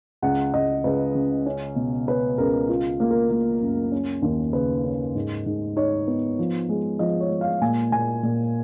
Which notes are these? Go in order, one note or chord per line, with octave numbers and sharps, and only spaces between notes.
C#2 F#5
C#2 D#5
C#2 B4
C#3
C#4
B2
C#4 B4
C#2 A#4
F4
A#3
A#4
A#3
F#2
C#4
D#2
C#3 B4
C#4
G#2
G#2
D#4 C#5
B3
F3
G#3
F3 D#5
C#5
G#3
F5
A#2 G#5
A#2 G#5
A#2